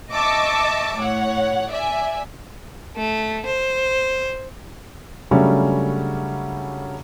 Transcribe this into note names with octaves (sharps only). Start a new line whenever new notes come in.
D#5 E5 A5 C#6 D6 E6
A2 C#5 F#5
D5 E5 G#5
A3
C5
C#3 F#3 G3 A3 C#4 D4